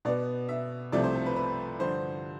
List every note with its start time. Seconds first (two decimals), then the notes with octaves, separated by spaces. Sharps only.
0.05 B2 B3 D5
0.49 E5
0.92 C2 C3 F3 A3 D5
1.04 C5
1.15 A4
1.26 B4
1.36 B4
1.80 G2 D3 F3 C5